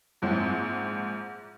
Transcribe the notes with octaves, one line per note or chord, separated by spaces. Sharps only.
A#1 G#2 C4